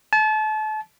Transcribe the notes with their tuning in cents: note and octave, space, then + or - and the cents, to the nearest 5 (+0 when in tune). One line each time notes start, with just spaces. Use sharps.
A5 -35